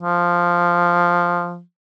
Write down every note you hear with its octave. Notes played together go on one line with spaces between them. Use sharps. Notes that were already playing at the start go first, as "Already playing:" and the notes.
F3